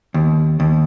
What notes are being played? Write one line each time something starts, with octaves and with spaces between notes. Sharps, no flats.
D#2
D#2